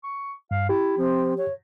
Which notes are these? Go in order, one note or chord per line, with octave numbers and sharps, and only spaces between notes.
C#6
G2 F5
E4 G4
F3 C4
C#5